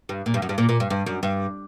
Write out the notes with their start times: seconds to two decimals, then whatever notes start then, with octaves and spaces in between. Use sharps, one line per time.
0.09 G2
0.26 A#2
0.34 G2
0.42 F#2
0.49 G2
0.58 A#2
0.69 A#2
0.80 G2
0.90 G2
1.06 F#2
1.23 G2